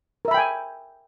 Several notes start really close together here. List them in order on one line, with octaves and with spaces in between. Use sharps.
A#4 E5 B5 G5 G#5